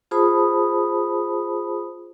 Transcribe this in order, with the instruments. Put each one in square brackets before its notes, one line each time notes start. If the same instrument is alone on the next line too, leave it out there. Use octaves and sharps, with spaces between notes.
[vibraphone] F4 G#4 C5 A5 B5 D#6